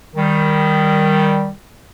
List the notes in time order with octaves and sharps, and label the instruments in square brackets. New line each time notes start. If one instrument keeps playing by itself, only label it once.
[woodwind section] D#3 G3